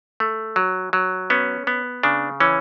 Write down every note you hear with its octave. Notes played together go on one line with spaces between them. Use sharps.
A3
F#3
F#3
B3 C#4
B3
C#3 D4
E3 C#4